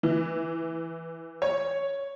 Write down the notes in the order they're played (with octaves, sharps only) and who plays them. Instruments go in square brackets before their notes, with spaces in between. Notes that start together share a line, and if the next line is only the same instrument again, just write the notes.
[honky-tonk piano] E3
C#5